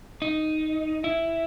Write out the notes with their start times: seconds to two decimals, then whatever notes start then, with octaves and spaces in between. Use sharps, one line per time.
0.22 D#4
1.04 E4